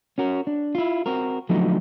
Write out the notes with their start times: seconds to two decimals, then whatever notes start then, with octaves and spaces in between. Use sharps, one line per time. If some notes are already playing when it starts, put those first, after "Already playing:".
0.18 C#4 F#4 A#4
0.47 D4
0.75 E4 F4
1.06 C4 F#4 A#4
1.49 D3 F3 F#3 A3 B3 D#4